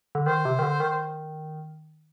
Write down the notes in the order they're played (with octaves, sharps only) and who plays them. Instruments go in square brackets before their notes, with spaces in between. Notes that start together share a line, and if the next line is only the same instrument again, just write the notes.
[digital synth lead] D3
[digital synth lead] D#3 [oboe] C5
[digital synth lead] C3
D#3
D3
D#3